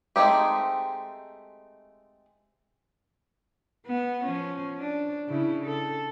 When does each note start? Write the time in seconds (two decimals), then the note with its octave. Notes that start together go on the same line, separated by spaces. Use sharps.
0.16 G#3 A3 C4 D#4 G4
3.86 B3
4.24 F3 C#4
4.79 D4
5.29 C#3 E4
5.66 A4